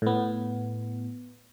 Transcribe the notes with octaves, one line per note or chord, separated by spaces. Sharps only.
A2 B3